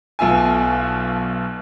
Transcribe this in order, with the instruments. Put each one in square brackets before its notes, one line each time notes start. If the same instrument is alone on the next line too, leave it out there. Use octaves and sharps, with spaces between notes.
[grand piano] B1 B2 F4 E5 G#5